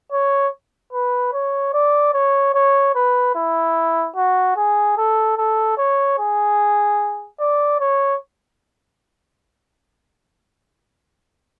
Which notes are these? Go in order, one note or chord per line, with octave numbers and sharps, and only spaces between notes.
C#5
B4
C#5
D5
C#5
C#5
B4
E4
F#4
G#4
A4
A4
C#5
G#4
D5
C#5